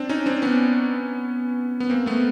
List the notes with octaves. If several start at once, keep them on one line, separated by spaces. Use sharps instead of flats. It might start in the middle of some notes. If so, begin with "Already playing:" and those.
Already playing: C4 D4
C#4 D#4
C4 D4
B3 C#4
B3
A#3 C4
A3 B3